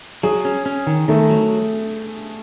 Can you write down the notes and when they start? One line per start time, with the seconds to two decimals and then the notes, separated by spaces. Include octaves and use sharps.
0.23 F#3 G#4
0.45 C#4
0.66 C#4
0.87 D#3
1.08 D#3 A3
1.30 F#3